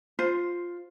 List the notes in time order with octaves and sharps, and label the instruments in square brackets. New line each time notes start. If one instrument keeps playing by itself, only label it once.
[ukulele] F4 C5